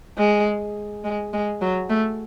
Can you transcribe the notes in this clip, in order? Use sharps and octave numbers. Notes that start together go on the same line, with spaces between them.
G#3
G#3
G#3
F#3
A3